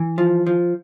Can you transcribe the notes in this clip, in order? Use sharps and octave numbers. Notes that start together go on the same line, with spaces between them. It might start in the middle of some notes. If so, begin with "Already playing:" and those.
Already playing: E3
F3
F3